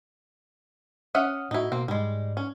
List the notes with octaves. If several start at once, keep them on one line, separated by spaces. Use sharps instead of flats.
C#4 E5 F#5 D#6 F6
A2 D#4 E4 F#4
B2 A#3 C4
G#2 G3 G#3
C#4